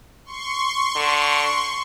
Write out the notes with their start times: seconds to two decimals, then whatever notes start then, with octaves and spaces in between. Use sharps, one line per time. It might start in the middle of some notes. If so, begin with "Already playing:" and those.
0.25 C6 C#6
0.96 D3